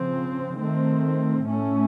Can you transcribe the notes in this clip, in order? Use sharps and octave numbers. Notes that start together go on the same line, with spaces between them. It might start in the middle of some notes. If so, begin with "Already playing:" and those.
Already playing: C#3 F3 C4
D#3 A3 C4
A2 A3 C#4